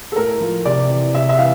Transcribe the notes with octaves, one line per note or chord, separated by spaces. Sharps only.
A4
A2 A#4
F3
C3 D5
E3
C3 E5
E5
E3 F5